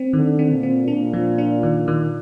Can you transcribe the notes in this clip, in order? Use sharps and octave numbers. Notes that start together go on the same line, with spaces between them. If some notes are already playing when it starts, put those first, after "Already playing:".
Already playing: C4
D3 D#3
C4
A#2
C4
A#2 D4
F3
D4
D#3
D#3